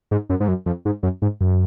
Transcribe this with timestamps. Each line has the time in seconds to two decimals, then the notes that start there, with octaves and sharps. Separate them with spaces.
0.11 G#2
0.29 F#2
0.40 G#2
0.48 F#2
0.66 F2
0.85 G#2
1.03 F#2
1.22 G#2
1.40 F#2